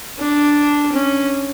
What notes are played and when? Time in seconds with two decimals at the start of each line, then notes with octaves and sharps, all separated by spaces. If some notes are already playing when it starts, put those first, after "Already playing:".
0.19 D4
0.93 C#4